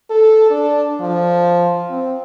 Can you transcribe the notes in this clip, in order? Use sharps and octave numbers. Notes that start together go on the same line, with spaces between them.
A4
D4
F3
C4